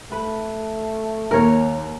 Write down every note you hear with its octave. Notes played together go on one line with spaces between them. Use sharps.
A3 B4
D#2 A#4 C#5